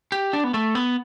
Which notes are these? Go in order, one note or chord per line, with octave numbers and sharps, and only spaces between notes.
G4
D4
B3
A3
B3